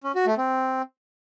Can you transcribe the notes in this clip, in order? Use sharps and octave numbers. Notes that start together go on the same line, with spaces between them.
C#4
F#4
A3
C4